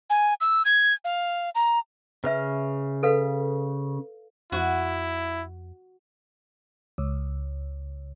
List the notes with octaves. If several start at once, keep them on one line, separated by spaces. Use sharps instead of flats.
G#5
E6
G#6
F5
A#5
C#3 B4 E5 F6
A4 B4 F5
F2 E4 F#4
C#2